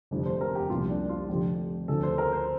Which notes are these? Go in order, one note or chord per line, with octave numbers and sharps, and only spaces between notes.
F1 F2 D3 F3
C5
A#4
G4
C2 A#2 F3 F4
D4
F4
F1 F2 D3 F3 G4
D2 D3 F3 A4
C5
A#4
C5